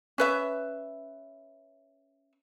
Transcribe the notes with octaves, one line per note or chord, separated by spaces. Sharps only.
C#4 B4 E5